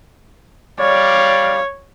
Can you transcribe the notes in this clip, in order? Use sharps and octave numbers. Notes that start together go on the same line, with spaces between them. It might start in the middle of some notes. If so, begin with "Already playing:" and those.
G3 C#5 D5 F5